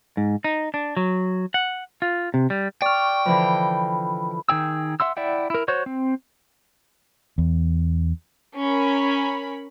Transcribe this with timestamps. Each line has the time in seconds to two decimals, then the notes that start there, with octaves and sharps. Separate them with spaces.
0.17 G#2
0.44 D#4
0.74 D4
0.97 F#3
1.54 F#5
2.02 F4
2.34 C3
2.50 G3
2.82 D5 G5 C#6 F6
3.26 D3 E3 F3 B5
4.49 D#3 G#4 G5 E6
5.00 E5 F#5 C6 E6
5.17 E4 D5 E5 F#5 G5
5.50 E4 A#4
5.68 F#4 C5 C#5 C#6
5.86 C4
7.38 E2
8.58 C#4 A#4 C#5 B5